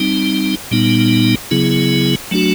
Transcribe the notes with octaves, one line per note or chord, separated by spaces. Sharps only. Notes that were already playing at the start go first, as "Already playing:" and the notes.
Already playing: G3 C4 D#4
A#2 G3 B3 D#4
C#3 F#3 B3 E4 G#4
F#3 A3 D4 F#4